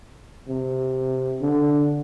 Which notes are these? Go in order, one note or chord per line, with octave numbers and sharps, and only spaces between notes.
C3
D3